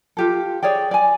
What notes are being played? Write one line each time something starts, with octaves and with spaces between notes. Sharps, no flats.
F4 G4 A4
G#4 C#5 D5 G5
D5 G#5